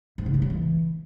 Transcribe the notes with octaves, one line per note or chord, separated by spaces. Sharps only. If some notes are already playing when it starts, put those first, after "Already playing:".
G#2
C#3
F3
F#3
E3